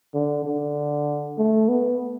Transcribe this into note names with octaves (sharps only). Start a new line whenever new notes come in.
D3
D3
A3
B3